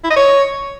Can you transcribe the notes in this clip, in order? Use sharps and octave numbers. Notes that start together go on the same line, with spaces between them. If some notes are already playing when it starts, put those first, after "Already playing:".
E4
D#5
C#5